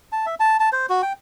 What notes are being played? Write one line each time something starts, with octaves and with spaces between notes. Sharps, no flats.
A5
E5
A5
A5
C5
F#4
G5